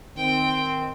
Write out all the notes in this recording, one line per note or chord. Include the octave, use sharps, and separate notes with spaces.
D#3 C4 G5